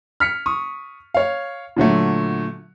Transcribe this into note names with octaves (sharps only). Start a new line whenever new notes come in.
F6 B6 C#7
C#6 D#6
C#5 F5
A#2 D3 F#3 A3